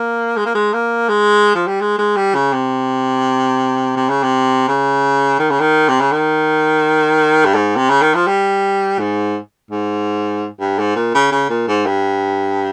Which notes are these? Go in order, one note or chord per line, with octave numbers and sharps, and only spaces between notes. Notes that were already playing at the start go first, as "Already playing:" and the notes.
Already playing: A#3
G#3
A#3
G#3
A#3
G#3
F3
G3
G#3
G#3
G3
C#3
C3
C3
C#3
C3
C#3
D#3
C#3
D#3
C3
C#3
D#3
G2
G#2
C3
C#3
D#3
F3
G3
G#2
G#2
G2
G#2
A#2
C#3
C#3
A#2
G#2
G2